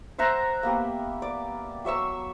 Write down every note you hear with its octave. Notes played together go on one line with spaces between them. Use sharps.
C5 E5 F#5 A#5
A#3 B3 G4
D5
F#3 E5 C#6 E6